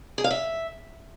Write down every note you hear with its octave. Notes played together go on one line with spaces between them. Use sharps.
G#4
F5
E5